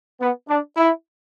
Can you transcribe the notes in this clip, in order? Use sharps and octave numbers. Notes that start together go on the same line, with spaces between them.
B3
D4
E4